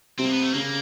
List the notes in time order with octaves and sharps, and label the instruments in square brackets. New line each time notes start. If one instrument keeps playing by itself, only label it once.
[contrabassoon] C3 [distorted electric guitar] C4
[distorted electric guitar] A#3
B3
A3
[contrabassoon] C#3 [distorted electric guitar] A#3